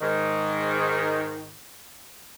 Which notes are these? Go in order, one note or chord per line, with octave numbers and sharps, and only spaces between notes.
G#2 D#3